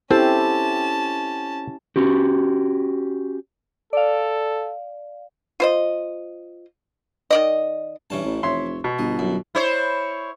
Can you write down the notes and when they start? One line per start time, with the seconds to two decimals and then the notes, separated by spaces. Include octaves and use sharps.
0.11 C4 C#4 E4 G4 A4 C5 A5
1.96 C#4 F#4 G4
3.93 A4 D5 F5
5.60 F4 C5 D#5
7.31 D#3 D5 D#5
8.10 G2 E3 C#4 A5
8.24 A1
8.43 F1 C#5 E5 C6
8.84 B2
8.99 G1 D#5
9.19 F#2
9.55 E4 C5 C#5